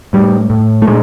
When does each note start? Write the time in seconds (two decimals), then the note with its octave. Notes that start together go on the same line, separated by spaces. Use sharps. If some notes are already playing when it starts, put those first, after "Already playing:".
0.13 A2 G3
0.50 A2
0.82 A3
0.87 A#2 G#3